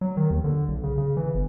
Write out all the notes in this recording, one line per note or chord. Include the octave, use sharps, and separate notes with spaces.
F#3
D#3
D#2
D3
B1
C#3
C#3
E3
G1